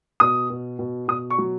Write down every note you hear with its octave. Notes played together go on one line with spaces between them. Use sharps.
B2 D#6
B2
B2
B2 D#6
C#6
F#3